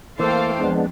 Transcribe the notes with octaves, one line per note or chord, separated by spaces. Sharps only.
E3 A3 A#3 A4 C5 F5 G5
F2 G#3 B3 D4